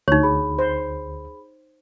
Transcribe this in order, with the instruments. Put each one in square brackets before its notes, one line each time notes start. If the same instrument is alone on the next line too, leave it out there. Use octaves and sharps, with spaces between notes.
[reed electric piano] D2 [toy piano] D#4 C#5 [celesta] C#6
[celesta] G#4 B5
[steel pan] C5